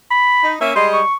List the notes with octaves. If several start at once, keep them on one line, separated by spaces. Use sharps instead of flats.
B5
D#4
A#3 C#4 E5
G3 G#3 D#5 C6
C#6